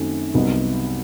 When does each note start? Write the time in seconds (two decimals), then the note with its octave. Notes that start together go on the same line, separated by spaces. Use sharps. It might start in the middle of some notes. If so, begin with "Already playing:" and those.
Already playing: F#2 D#3 A3 C4
0.34 C2 C3 F#3 B3 D#4